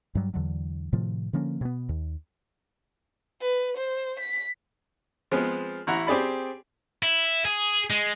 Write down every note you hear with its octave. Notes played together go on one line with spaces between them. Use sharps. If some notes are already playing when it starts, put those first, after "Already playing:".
G2 F#3 G3
E2 D3 E3 F#3
A2 C3 D#3 F3
D3 F3 A#3 C#4
B2 B3
D#2
B4
C5
B6
F3 G#3 B3 C4
A1 E4 F#5 A#5
C4 G4 G#4 D5 B5
E4
G#4
G#3